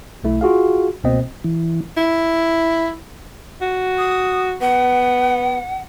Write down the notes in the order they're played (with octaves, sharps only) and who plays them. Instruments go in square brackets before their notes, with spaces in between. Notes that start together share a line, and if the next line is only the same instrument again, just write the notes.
[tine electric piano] B1 A3 E4
F4 F#4 G#4 F5
C#2 B2 A#3 C4 D#5
[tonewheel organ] E3
[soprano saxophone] E4
[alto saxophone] F#4
[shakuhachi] D#6
[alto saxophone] B3 [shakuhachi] F#5